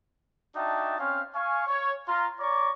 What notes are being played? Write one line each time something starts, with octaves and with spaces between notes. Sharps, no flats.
D4 D#4 F#4 E5 G5 A5
C4 C#4 F5
F5 G#5 C#6
C#5
F4 A#5 C6
C#5 D5 A#5 C#6 D6